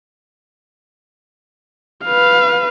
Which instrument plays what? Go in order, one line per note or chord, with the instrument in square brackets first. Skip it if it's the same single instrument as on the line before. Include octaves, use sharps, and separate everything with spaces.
[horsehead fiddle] B4 F5